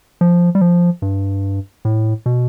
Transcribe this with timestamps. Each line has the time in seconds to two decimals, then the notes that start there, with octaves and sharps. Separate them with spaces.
0.21 F3
0.55 G3
0.61 F3
1.02 G2
1.85 A2
2.26 B2